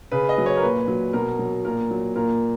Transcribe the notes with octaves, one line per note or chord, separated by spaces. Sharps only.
C#3 B4
D#5
F#3
C#5
A#4
A#2 B4
F#3
B2 A#4
F#3
A#2 A#4
F#3
A#2 A#4